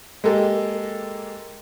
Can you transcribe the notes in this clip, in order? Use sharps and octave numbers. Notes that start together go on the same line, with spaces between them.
G#3 A#3 G4 A4